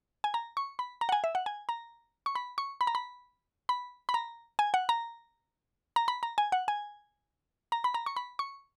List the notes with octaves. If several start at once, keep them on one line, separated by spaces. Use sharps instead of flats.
G#5
A#5
C#6
B5
A#5
F#5
G#5
E5
F#5
G#5
A#5
C#6
B5
C#6
B5
A#5
B5
B5
B5
A#5
G#5
F#5
A#5
A#5
B5
A#5
G#5
F#5
G#5
A#5
B5
A#5
C#6
B5
C#6